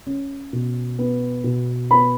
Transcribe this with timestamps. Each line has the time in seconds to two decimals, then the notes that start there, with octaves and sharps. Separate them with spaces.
0.06 C#4
0.53 B2
0.99 B3
1.44 B2
1.90 B3 B5